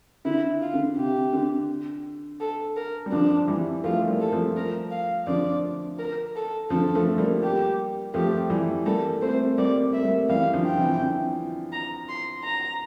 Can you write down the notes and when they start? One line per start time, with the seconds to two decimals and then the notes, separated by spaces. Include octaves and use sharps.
0.25 D3 E4
0.62 F4
0.74 D3
0.97 C3 G4
1.33 D3
2.40 A4
2.77 A#4
3.06 G3
3.12 D3 F3 D4
3.48 E3 G3
3.84 F3 A3 F4
4.08 G3 A#3
4.20 A4
4.32 F3 A3
4.56 A#4
4.91 F5
5.27 D3 F3 D5
5.99 A#4
6.36 A4
6.70 D3 F3 A4
6.95 F3 A3
7.18 G3 A#3
7.43 G4
8.14 F3 A3 G4
8.50 E3 G3
8.85 G3 A#3 A4
9.21 A3 C4 C5
9.57 G3 A#3 D5
9.93 E5
9.98 A3
10.05 G3 A#3
10.29 E3 G3 F5
10.53 D3 F3
10.66 G5
10.77 C3 E3
11.01 D3
11.73 A#5
12.09 C6
12.44 A#5